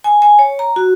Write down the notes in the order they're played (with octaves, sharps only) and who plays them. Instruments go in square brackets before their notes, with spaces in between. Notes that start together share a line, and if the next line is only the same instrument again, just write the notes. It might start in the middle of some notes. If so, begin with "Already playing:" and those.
[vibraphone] G#5
G#5
C#5
A#5
F#4